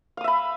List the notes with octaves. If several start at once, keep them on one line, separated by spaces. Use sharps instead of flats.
E5 F5 B5 D#6